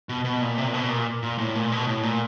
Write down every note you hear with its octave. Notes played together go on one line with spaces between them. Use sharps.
B2
B2
A#2
C3
A#2
B2
A#2
A#2
A2
A#2
B2
A2
A#2